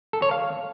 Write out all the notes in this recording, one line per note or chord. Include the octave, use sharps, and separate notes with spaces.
A4
C#5
F5